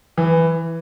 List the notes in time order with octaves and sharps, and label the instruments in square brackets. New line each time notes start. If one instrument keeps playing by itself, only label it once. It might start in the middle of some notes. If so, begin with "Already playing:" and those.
[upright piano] E3